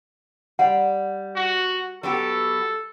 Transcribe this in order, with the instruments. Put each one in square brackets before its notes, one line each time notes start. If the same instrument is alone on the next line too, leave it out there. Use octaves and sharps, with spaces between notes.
[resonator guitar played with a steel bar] G3 [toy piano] F#5
[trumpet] F#4
[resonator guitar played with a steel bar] F#3 B3 G4 [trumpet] A4